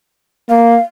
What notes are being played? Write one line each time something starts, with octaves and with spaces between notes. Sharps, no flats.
A#3 F5